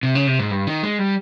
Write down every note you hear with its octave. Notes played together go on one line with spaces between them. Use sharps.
C3
C#3
C3
G#2
G2
D#3
G#3
G3